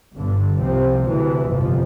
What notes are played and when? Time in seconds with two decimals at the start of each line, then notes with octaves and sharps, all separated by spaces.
0.15 G1 G2 D3
0.59 C2 C3 F3 C4
1.04 D2 C3 E3
1.49 G1 F2 C3 F3